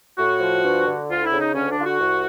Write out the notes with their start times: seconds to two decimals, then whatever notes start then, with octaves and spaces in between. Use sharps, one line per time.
0.17 A2 F#4
0.40 F3
0.63 G2
0.86 D3
1.09 D2 F4
1.24 E4
1.32 C#3
1.39 D#4
1.54 D2 C#4
1.69 D4
1.77 D3 F4
1.84 F#4
2.00 C2